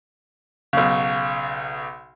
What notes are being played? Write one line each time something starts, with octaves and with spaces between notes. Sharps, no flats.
B1 C#3